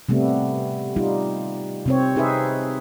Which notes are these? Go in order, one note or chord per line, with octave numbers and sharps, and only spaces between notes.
C3 G3 A3 B3
G3 D#4 F4
C3 C4 C#5
D#4 G#4 B4 C5 E5